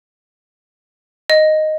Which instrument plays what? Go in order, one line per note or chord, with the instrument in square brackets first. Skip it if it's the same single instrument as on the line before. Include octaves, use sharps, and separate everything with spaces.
[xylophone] D#5